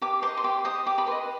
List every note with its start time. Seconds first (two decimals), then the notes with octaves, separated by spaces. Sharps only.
0.02 G4 D6
0.22 C5 D6
0.27 D#5
0.38 C6
0.44 G4 D6
0.64 C5 D#5 D#6
0.87 G4 D6
0.98 B5
1.07 B4 D#5 C6